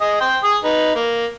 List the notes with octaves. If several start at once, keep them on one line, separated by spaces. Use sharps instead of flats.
G#4 D#5
G5 C6
G#4 D#6
D#4 B4
A#3